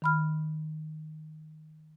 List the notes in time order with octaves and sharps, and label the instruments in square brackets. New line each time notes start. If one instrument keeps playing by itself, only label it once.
[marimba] D#3 B5 F6